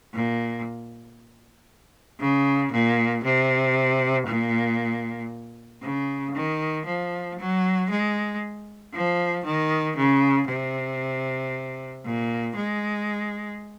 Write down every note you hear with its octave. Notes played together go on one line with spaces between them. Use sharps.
A#2
C#3
A#2
C3
A#2
C#3
D#3
F3
F#3
G#3
F3
D#3
C#3
C3
A#2
G#3